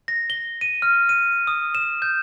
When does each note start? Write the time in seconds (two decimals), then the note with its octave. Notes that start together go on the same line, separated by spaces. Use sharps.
0.08 A#6
0.30 G7
0.61 D#7
0.82 F6
1.09 D#7
1.47 D#6
1.75 E7
2.02 G6